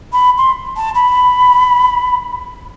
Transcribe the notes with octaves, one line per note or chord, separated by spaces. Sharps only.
B5
C6
A5
B5